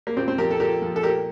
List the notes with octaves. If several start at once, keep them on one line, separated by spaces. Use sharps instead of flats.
A#3
A#2 C4
C4
F3 G4 A#4
A4
A#2 G4 A#4
F3
A4
A#2 G4 A#4